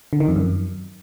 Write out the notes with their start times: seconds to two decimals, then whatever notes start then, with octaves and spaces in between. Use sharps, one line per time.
0.13 D3
0.20 D#3
0.28 F2
0.36 F#2